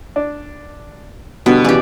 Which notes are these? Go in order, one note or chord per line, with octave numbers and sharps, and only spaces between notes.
D4
B2 D3 G3 B3
C#3 E3 G4 D5